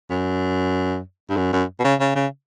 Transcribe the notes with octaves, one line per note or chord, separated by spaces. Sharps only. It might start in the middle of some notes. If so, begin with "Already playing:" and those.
F#2
G2
F#2
F#2
B2
C#3
C#3
C#3